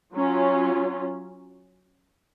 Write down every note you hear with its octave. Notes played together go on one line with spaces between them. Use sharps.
F#3 C#4 F4